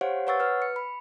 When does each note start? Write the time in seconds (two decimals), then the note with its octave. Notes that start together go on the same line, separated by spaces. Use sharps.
0.01 G4 C5 C#5 F5 F#5
0.27 B4 C#5 F#5 C#6 E6 A6
0.40 B4 F6
0.62 C#7
0.76 B5